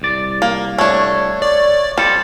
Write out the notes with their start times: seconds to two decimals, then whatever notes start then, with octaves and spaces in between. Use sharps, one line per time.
0.02 C2 D5
0.42 A#3
0.78 A3 D4 C#5
1.00 C#5
1.42 D5
1.98 G3 C4 A4